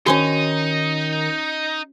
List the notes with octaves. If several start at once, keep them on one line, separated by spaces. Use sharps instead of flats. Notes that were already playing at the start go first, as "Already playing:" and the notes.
D#3 C#4 D#4 F#4 G#5 C6